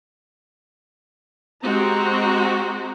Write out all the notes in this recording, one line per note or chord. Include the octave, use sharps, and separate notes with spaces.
G#3 C4 F#4 G4 A#5